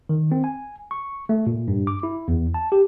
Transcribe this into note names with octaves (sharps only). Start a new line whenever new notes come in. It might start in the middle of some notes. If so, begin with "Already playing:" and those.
D#3
C4
G#5
C#6
A3
A#2
G2
D6
E4
E2
A5
G4